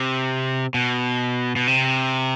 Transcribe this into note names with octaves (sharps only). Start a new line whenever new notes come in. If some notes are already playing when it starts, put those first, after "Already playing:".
Already playing: C3
B2
B2
C3